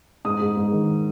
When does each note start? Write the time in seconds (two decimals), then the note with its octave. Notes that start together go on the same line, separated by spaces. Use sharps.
0.25 G#2 D#6
0.41 G#2
0.57 G#2
0.72 D#3